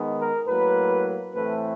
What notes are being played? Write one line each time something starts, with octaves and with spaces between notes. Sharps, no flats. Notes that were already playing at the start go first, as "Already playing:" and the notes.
Already playing: D#3 G#3 B3
A#4
A2 F#3 A#3 B4
A2 E3 A3 C4 B4